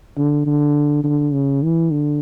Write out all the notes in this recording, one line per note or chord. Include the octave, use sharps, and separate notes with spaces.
D3
D3
D3
C#3
E3
D3